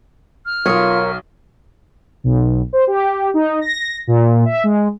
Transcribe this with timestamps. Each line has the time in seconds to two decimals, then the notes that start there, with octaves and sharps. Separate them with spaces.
0.46 F6
0.66 B1 F4 A#4 C#5 D#6
2.24 B1
2.73 C5
2.87 G4
3.34 D#4
3.61 A#6
4.07 A#2
4.45 E5
4.64 G#3